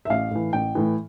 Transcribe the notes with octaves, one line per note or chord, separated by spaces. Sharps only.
E5
A1 F5
A2 E3
A1 G5
A2 E3